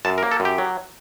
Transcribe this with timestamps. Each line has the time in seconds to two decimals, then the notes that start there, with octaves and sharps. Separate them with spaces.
0.05 F#2 A5
0.18 A#4
0.23 A#3
0.31 A4
0.40 F#2
0.45 G4
0.58 F#3